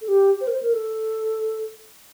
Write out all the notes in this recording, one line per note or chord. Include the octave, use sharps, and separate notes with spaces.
A4
G4
C5
A#4
C5
A#4
A4